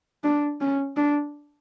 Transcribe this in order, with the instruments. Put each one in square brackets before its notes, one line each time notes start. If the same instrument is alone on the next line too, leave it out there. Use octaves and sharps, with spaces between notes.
[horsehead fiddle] D4
C#4
D4